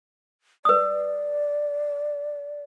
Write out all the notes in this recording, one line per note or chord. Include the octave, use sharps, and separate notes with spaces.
B4 D5 D#6